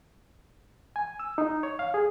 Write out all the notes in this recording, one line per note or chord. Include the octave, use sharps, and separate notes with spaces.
G#5
E6
D#4
C#5
F5
G#4